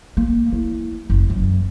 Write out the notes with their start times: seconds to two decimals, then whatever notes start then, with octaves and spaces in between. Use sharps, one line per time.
0.17 A#3
0.53 E4
1.10 F#1
1.30 F#2